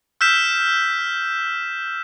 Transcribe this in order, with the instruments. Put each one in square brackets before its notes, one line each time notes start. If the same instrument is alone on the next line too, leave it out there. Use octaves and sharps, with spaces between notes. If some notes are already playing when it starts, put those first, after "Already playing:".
[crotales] E6 F6 G6 B6 E7